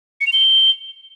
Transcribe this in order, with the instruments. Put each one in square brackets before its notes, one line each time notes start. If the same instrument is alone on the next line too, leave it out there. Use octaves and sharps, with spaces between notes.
[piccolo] C#7
F7
G7